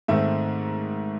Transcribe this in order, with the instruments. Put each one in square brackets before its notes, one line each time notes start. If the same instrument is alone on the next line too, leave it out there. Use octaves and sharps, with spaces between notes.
[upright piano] G#2 D#3 A3 C4 E5